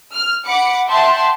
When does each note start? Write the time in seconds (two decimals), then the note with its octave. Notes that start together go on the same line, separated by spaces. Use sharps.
0.13 F6
0.44 F#5 B5 D6 C#7
0.87 E5 F#5 G5 A5 C6